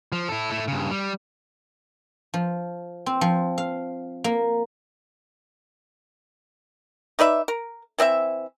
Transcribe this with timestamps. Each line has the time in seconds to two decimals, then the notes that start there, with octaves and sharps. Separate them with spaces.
0.12 F3
0.28 E4 A4
0.51 A3 E4
0.68 G2 C#3
0.91 G3
2.34 F3
3.06 C4
3.21 F3
3.58 F5
4.24 A#3
7.19 D#4 B4 D5 E5
7.48 A#4
7.99 E3 C4 D#5 E5